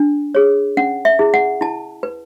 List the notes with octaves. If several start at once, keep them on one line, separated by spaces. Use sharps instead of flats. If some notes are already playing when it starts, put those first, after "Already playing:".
Already playing: D4
G#4 C#5
C#4 F#5
E5
E4 G#4
F#5
E4 A5
B4